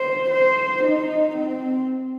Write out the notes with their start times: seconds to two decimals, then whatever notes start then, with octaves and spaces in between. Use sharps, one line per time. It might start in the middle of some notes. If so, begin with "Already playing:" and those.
Already playing: C5
0.30 C5
0.84 D#4
1.37 C4